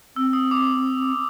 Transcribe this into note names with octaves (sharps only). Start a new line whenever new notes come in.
C4 E6
D#6
D6